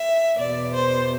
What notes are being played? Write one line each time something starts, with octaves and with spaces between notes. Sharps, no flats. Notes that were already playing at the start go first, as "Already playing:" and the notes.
Already playing: E5
E2 B2 B3 D5
C5